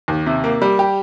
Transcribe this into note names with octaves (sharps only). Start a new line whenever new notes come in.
D#2
C3
A#3
G3
G4